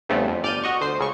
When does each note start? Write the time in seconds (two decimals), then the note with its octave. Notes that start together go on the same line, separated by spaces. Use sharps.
0.09 E2 G2 C#3 A3 B3 C4
0.28 F2
0.43 G1 D5 F6 G6 D#7
0.64 F#4 D#5 C#6
0.81 D2 C5 C7
0.99 C#2 C#3 C#6